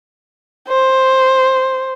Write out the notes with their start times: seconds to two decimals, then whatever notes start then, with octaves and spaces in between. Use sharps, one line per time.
0.68 C5